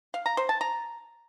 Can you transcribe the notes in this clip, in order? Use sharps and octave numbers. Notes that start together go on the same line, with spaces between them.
F5
A#5
C5
A5
A#5